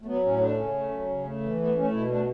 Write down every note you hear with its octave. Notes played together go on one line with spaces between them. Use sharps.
A3
F#3 B3
A2 C#4
A3 D4
C#3 C#4
A3
F#3
C#3
A3
E3
A3 B3
A3 C#4
B2 E4
A3 D4